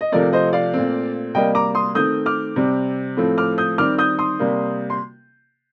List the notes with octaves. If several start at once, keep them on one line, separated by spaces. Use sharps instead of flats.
D#5
C3 F3 A3 C4 A#4 D5
C5 D#5
D5 F5
A#2 A3 C4
C3 G3 A#3 D#5 G5
A#5 D6
C6 D#6
D#3 A3 C4 D#6 G6
D6 F6
C3 G3 C4
A2 F3 A3 C4
D6 F6
D#6 G6
D#3 G3 C4 D6 F6
D#6 G6
C6 D#6
C3 G3 A#3
C6